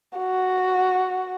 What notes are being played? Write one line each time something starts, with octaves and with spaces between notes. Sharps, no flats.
F#4